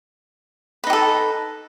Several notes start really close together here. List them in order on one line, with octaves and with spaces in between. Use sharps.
B4 D#4 G4 A4